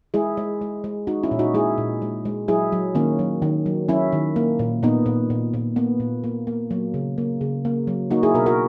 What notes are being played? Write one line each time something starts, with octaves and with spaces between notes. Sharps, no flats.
G#3 E4 G#4
G#3
G#3
G#3
G#3 D#4 F#4
C#4 E4
A#2
D#4 F#4
G#3 E4 G#4
A#2
G#3
G#3
F#3 E4 G#4
F#3
D#3 A#3 C#4
F#3
D#3
F#3
F#3 C#4 E4
D#3
A#3
A#2
A#2 B3 D#4
A#2
A#2
A#2
A#3 B3
A#2
A#3
A#3
F#3 A#3
C#3
A#3
C#3
A#3
F#3
A#3 D#4 F#4
E4 G#4
B2 F#4 A#4
F#4 A#4